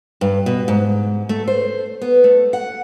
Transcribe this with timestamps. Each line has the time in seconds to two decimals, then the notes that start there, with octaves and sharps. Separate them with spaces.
0.21 G2
0.46 B2
0.68 G#2
1.29 A3
1.48 C5
2.01 B3
2.24 A3
2.53 F#5